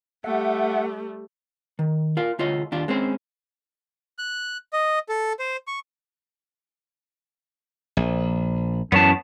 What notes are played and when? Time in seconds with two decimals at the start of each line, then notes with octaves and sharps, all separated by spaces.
0.24 G3 A3 E5 F#5
1.79 D#3
2.17 F4 A#4 F5
2.39 D2 F4 C#5 D#5
2.72 D#2 D4 F4
2.88 G#3 C4 C#4 C5
4.18 F#6
4.73 D#5
5.09 A4
5.39 C5
5.67 C#6
7.97 A#1
8.92 F#2 E3 B3 C#4 A5